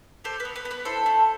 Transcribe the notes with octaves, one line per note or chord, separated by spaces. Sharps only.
G4 A4 C5
B4
B3
B4
B3
B4
E4 A4 C5
A3